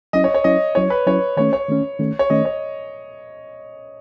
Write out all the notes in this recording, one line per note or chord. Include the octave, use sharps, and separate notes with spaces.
F#3 C#4 E4 D#5
C#5
C#5
F#3 C#4 E4 D#5
F#3 C#4 E4 C#5
B4
F#3 C#4 E4 C#5
D#3 A3 C#4 C#5
C#5
D#3 A3 C#4
D#3 A3 C#4
C#5
D#3 A3 C#4 D#5
C#5